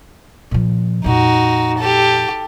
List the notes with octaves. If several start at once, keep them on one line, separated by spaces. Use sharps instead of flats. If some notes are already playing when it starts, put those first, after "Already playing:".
A#2 F3
F2 A#2 D#4 F#4
G4 A4